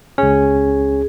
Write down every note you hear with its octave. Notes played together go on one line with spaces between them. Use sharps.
C#2 C#4 G#4